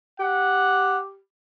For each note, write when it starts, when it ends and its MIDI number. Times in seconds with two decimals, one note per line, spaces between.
0.20 1.18 67
0.20 1.00 78